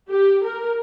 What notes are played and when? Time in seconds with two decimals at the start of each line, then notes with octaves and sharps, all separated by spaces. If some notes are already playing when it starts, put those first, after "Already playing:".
0.11 G4
0.45 A#4